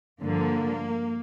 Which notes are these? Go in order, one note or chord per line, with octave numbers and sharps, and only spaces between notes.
G2 D3 F3 A#3